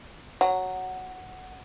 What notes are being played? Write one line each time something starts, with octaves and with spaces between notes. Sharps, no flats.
F#3 F#5